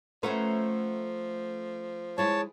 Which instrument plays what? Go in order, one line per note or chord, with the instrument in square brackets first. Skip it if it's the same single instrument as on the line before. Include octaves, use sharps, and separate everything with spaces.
[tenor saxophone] F3 [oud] A3 C#4 B4 [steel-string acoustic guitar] C5 F#5 A#5
[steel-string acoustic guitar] G#3 E4 G#4 [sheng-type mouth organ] C#5 A5